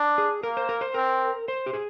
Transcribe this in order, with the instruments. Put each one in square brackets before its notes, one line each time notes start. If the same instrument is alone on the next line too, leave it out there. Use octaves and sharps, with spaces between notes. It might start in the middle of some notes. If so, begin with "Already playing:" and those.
Already playing: [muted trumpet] D4
[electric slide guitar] G#4
[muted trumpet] A#3 [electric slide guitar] A#4
[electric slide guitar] C5
A#4
C5
[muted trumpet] C4 [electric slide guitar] A#4
[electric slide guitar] C5
G4
G#4